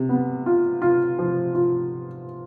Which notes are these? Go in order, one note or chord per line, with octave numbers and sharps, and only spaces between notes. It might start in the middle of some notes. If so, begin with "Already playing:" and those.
Already playing: C3
B3
F4
F4
F3
F4